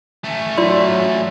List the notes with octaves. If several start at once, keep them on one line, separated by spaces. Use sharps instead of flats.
A3 C#4
F#3 F4 D5 C6